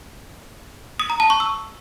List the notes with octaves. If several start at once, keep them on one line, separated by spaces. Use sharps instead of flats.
D#6
A#5
A5
C#6
E6